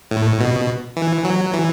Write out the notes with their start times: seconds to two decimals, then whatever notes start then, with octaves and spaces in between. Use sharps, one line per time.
0.11 A2
0.40 B2
0.97 E3
1.25 F#3
1.54 E3